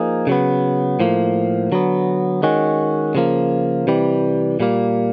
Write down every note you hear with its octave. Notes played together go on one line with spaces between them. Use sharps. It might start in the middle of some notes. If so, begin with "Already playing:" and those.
Already playing: F3 A#3 D#4 G#4
C#3 F#3 B3
A2 F3 A#3
D3 F#3 B3
D#3 G#3 C#4 F#4
C#3 F3 A#3
C3 E3 G3
A#2 G3 A#3